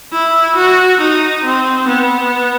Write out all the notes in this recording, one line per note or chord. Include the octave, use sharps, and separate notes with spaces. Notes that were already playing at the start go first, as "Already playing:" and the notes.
E4
F#4
D#4
C4
B3